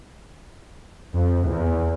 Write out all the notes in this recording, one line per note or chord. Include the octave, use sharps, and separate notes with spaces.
F2
E2